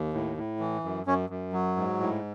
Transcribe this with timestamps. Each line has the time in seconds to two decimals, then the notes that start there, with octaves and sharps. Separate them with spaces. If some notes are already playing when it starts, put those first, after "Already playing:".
Already playing: D#2
0.14 A2
0.37 A2
0.60 E3
0.84 F#2
1.06 F#2 C#4
1.30 F#2
1.53 F#3
1.76 G#2
2.00 A2